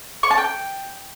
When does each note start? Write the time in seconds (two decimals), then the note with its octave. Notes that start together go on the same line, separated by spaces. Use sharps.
0.23 C#6
0.30 A5
0.38 G5